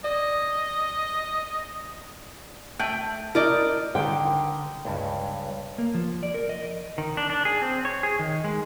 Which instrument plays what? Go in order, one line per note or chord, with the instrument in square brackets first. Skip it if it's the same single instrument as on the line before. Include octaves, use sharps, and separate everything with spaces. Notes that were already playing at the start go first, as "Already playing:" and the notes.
[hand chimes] D5 [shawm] D#5
[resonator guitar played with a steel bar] A3 G5 [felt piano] G6
[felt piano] E4 [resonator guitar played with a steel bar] A#4 D5 D#5
[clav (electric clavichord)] D3 D#3 [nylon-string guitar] G5
[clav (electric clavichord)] C#2 G2
[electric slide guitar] A#3
F3
D5
A#4
D#5
D#3
D4
D4
G#4
C4
C#5
G#4
D#3
G#3